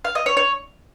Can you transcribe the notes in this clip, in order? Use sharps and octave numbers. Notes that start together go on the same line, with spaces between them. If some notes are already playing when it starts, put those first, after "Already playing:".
F5
D#5
C#5
C#5